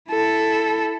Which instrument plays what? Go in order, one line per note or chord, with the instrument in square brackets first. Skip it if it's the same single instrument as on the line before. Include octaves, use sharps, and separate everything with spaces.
[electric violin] E4 A4